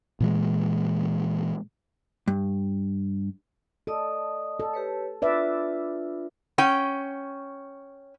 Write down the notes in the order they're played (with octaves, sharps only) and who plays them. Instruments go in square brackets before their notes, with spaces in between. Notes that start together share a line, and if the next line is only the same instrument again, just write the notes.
[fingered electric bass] A#2 E3 G#3
[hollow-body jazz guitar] G2
[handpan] A4 [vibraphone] D5 D#5 D#6
[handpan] A4
[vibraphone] G4 B4 C#5
[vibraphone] D4 F4 [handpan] B4 D5 E5
[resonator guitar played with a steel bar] C#4 G5